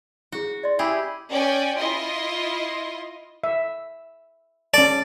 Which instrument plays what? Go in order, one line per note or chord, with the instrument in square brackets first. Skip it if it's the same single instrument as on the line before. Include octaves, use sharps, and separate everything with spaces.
[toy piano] E4 G#4 [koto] F#4
[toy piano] D5 D#5 C6
[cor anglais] E4 [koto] G4 G#4
[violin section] C#4 D5 G5 G#5
E4 F4 D#5 C6
[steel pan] E5
[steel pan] C#4 A5 [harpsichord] D5